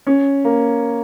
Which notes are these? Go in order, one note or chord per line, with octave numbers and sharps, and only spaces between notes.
C#4
A#3